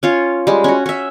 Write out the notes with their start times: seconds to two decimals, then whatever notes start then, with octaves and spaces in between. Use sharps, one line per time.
0.03 C#4 F4 C#5
0.47 G3 G#3
0.64 C#4 F#4
0.86 C#4 E5